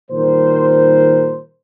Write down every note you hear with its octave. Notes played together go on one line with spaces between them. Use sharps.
A#2 D#3 G3 A#4 C5